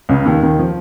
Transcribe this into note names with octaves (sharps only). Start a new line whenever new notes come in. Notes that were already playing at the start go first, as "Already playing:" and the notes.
C#2 C#3
D#2 D#3
D#2 D#3
F3